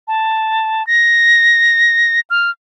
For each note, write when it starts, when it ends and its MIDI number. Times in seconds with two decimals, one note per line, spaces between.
0.08 0.85 81
0.87 2.20 94
2.30 2.50 89